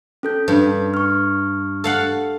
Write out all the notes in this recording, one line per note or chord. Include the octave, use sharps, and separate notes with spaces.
C#4 A4 G6
G2
C#6 F6
A4 F5 F#5